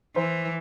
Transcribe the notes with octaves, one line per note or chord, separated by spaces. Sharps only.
E3 C5